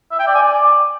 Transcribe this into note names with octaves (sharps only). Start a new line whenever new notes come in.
E5
G5
D5
G#5
D5